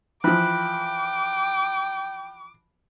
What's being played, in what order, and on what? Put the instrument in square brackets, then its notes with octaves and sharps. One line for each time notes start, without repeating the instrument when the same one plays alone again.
[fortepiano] E3 F3 [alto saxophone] G5 [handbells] B5 F#6 [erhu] D6